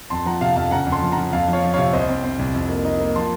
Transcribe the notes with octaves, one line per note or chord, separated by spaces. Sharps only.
F2 A5 C6
F3 F#5 A#5
C3 F5 A5
F2 F5 A5
C#3 F#5 A#5
F2
A5 C6
F3
F#5 A#5
F3
F2 F5 A5
F3 C#5 F5
F3
C3 C#5 F5
C2 C5 D#5
C4
C4
C2
F2
A#3
D#4
A#3
F3 A5 C6